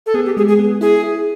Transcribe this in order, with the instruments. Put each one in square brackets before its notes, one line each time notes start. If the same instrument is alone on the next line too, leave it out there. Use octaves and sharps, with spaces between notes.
[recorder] A4
[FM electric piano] B3 [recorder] G#4
[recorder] G4
[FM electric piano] G#3 [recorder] G#4
[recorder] G#4
[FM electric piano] B3
[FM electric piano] E4 [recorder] G#4
[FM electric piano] E4